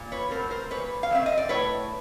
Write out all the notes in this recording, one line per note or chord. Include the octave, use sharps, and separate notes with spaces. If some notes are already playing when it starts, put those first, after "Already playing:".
Already playing: A#2
B4 C#5
F#3 A3 C4 A#4 C5
A#4 C5
A#2 B4 C#5
F5
F#3 A3 C4 E5
D#5
D5
A2 B4 C#5